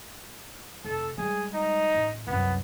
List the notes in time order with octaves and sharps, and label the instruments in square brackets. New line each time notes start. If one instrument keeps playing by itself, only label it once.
[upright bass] F1 [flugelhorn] A4
[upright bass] G3 G#3 [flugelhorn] G#4
[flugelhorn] D#4
[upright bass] A1
[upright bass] C2 F#2 [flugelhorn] B3